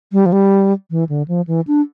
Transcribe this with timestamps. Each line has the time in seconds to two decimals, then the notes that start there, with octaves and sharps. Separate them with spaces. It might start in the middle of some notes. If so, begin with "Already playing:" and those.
0.13 G3
0.26 F3
0.33 G3
0.91 E3
1.09 D3
1.28 F3
1.47 E3
1.67 D4